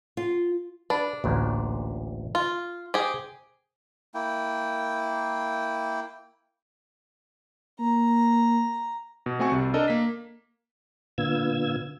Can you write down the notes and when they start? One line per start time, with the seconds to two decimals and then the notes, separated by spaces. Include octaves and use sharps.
0.17 F4
0.90 D4 B4
1.24 A1 D2 A#2
2.35 F4
2.94 G4 G#4 C5
4.15 A#3 E4 G5
7.80 A#3 A#5
9.26 B2
9.39 A3 C4 F#4 G#5 C#6
9.52 C2 C3
9.74 D4 A4 A#4 D#5
9.88 A#3 B6
11.18 A#2 D3 B3 F4 E6 G#6